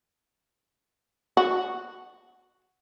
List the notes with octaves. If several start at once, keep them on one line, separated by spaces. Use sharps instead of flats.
F#4